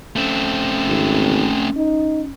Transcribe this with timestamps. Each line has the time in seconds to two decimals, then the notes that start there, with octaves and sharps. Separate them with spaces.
0.16 A3 C4 C#4
0.87 G#1
1.76 D#4